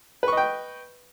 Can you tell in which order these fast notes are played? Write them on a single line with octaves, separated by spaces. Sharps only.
B4 C#6 D#5 G5